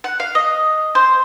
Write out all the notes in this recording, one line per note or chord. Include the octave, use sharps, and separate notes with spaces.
F#5
F5
D#5
C5